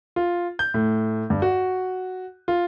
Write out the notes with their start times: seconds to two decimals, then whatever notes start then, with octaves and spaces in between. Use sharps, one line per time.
0.16 F4
0.59 G6
0.74 A2
1.30 G2
1.42 F#4
2.48 F4